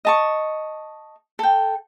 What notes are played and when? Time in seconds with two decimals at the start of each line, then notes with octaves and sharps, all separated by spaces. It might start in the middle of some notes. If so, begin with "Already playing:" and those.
0.05 D#5 A5 C#6
1.39 A4 G5